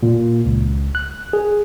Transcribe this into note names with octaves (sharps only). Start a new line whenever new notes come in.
A#2
C#2
F#6
G#4